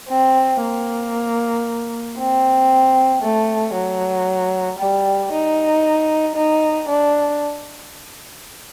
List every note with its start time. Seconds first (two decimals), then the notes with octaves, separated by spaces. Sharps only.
0.09 C4
0.62 A#3
2.18 C4
3.23 A3
3.75 F#3
4.80 G3
5.32 D#4
6.36 D#4
6.89 D4